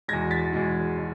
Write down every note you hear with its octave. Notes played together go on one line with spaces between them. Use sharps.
E2 B2 G#3 G#6 A#6
A6 B6
E2 B2 G#3
B2